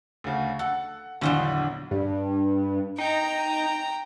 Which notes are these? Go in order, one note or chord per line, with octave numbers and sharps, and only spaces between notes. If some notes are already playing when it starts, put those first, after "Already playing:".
D2 C#3
A4 F#5
A#1 E2 D3 D#3 F#3
G2
D#4 G5 A#5